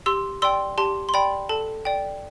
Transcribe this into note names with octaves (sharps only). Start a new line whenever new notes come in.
G4 C6 E6
D5 G5 C6 E6
G4 A5 C6
C6
D5 G5 B5
A4 A5
D5 G5